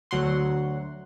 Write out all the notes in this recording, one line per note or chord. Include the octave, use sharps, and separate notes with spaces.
D2 F#3 F#5 C6